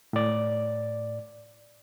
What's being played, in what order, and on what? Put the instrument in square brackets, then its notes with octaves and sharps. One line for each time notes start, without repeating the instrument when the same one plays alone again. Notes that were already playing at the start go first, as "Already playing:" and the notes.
[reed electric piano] A2 D5